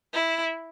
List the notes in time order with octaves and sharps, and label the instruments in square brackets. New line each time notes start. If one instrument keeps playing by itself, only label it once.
[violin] E4